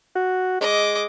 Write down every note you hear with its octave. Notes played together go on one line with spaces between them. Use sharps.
F#4
G#3 D#5 D6